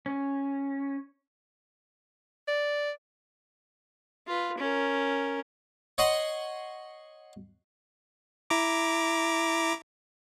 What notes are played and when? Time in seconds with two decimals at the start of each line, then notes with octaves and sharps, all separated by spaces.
0.06 C#4
2.48 D5
4.27 F4 B4
4.58 C#4 A#4
5.98 C#5 D#5 F#5 C6 C#6
8.50 E4 A#5 D6